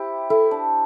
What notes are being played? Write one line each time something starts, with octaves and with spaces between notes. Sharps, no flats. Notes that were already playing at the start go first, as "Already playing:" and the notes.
Already playing: C4 E4 G4
E4 A4
D4